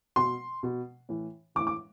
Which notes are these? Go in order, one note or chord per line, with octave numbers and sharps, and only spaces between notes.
B2 C6
B2
A2 E3
A2 E3 D6
D6